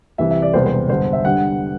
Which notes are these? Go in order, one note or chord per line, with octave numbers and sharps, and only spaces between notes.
C2 C3 E3 E5
E5
D5
E1 E2 C3 G3 C5
C5
G1 G2 D3 C5
E5
D3 G3 F#5